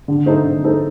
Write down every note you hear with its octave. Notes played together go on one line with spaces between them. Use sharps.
D3
A3 D#4 A4 C5
D3
A3 D#4 A4 C5